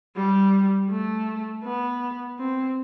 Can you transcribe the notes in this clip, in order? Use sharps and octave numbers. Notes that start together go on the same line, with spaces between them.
G3
A3
B3
C4